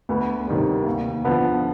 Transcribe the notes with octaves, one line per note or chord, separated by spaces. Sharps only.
D2 B3
C3 D#3 G3
D#2
D3 F3 B3